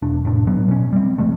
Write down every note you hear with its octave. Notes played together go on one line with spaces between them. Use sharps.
E1 D4
F1 A2 D4
B1 A2 F#3 B3
B2 C#4
G3 C4
G1 F3 G#3 A3